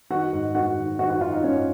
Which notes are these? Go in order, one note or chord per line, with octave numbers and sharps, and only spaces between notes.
D#3 F#4 F#5
G#2
G#2 F#4 F#5
D#3
D#3 F#4 F#5
F#4 F#5
D#3 F4 F5
D#4 D#5
G#2 C#4 C#5